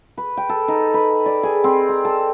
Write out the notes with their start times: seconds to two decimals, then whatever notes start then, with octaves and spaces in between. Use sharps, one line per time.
0.18 B4
0.37 G5
0.49 A4
0.68 D#4
0.94 B4
1.26 D5
1.43 G#4
1.64 C4
1.89 A#5
2.05 A4